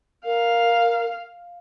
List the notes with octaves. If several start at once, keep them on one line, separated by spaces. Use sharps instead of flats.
A#4 F5